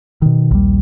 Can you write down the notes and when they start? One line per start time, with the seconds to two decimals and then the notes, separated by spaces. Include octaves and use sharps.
0.22 B2 D#3
0.51 A#1 D#2 G3